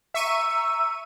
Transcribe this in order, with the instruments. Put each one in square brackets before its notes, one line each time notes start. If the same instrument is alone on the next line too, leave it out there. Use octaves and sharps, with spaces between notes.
[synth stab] E5 C#6 D#7 [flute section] A#5 E6